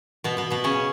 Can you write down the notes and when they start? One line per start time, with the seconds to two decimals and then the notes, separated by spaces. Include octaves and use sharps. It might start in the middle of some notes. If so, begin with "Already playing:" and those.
0.24 B2 B3
0.37 B2 B3
0.50 B2 B3
0.64 C#3 C#4